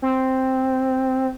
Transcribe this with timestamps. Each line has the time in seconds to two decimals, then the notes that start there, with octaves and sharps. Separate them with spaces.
0.02 C4